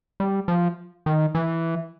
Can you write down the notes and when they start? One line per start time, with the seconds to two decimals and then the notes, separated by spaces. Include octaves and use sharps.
0.20 G3
0.48 F3
1.06 D#3
1.35 E3